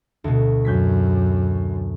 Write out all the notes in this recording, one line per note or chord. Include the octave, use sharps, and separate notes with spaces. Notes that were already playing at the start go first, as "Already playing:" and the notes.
D2 B2
F#2 G6 G#6 B6